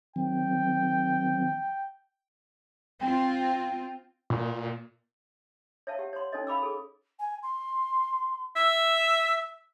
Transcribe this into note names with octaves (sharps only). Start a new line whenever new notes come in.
D#3 F#3 C4 G5
C4 F4 G5
A#2
C#5 E5 F5 A5
G4 F#5
C#5 C6
C#4 D#4 A4 C#5 D#5
F5 B5 D6 E6
G#4 A4
G#5
C6
E5 E6